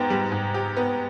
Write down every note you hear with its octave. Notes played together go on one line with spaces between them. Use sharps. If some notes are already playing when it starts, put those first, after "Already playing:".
Already playing: G#2 B3 G4
G3
G#2
G4
B3